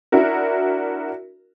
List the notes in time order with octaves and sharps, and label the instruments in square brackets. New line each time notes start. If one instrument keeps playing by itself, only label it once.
[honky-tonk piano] D4 E4 F#4 A#4